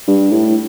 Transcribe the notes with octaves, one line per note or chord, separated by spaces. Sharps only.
G2
A2